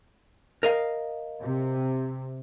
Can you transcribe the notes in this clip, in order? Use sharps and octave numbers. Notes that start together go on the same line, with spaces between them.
A#4 D#5 F5
C3